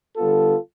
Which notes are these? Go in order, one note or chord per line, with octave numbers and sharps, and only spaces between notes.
D3 G3 B3 F4 A4